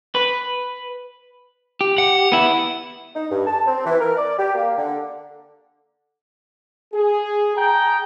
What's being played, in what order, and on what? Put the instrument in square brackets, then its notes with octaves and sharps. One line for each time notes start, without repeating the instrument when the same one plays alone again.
[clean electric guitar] B4
[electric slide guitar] G4
[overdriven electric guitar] F#5
[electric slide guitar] B3 E4
[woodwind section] D#4
G2
A5
C4
E3
A#4
D5
G4
A#3
D3
[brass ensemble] G#4
G#4 G5 A5 A#5